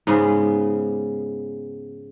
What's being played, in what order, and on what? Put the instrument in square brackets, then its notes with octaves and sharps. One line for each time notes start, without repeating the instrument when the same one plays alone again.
[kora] G#2 C#3 G#3 B3